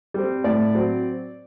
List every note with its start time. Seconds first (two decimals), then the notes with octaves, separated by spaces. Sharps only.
0.14 G3 C4
0.44 A2 D5
0.75 F#3 C4